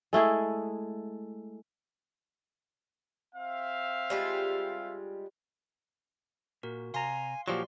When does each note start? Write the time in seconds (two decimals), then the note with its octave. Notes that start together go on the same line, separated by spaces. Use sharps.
0.13 G#3 A3 E4 G#4
3.34 C4 E5 F5
4.10 G3 G#3 F4
6.63 A#2 F#4 A#4
6.94 C3 F5 G#5 A#5 C6 C7
7.48 A#2 F3 F#3 F#4 G4 A#4 D5 C6